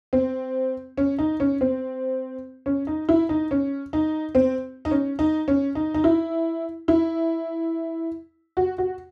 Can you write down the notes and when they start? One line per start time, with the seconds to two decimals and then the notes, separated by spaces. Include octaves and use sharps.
0.13 C4
0.98 C#4
1.19 D#4
1.40 C#4
1.61 C4
2.66 C#4
2.87 D#4
3.09 E4
3.29 D#4
3.51 C#4
3.93 D#4
4.35 C4
4.85 D#4
4.91 C#4
5.19 D#4
5.48 C#4
5.75 D#4
5.94 D#4
6.04 E4
6.88 E4
8.57 F#4
8.78 F#4